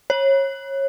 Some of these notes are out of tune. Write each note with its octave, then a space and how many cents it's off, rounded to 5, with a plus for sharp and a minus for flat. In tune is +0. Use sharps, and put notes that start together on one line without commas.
C#5 -25